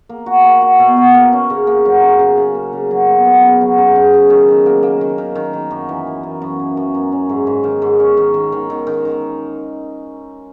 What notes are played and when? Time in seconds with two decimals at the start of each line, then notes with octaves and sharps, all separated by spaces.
0.09 A#3
0.26 F#4
0.44 A#3
0.61 F#4
0.79 B2
0.97 F#4
1.14 A#3
1.33 C#4
1.50 C#3
1.67 A#3
1.85 F#3
2.03 C#3
2.19 C#3
2.37 C#3
2.55 A#3
2.73 C#3
2.91 F#3
3.07 B3
3.25 B3
3.42 C#3
3.61 F#3
3.78 C#3
3.95 C#3
4.14 C#3
4.30 D#3
4.48 D#3
4.66 A#3
4.83 A#3
5.01 D#3
5.18 D#3
5.35 D#3
5.53 D#3
5.70 F#2
5.89 E3
6.07 E3
6.23 F#2
6.42 F#2
6.60 E3
6.77 F#2
6.94 F#2
7.12 C#4
7.29 G#2
7.47 G#2
7.64 D#3
7.82 G#2
8.00 C#4
8.17 D#3
8.34 D#3
8.52 D#3
8.70 D#3
8.87 D#3
9.05 D#3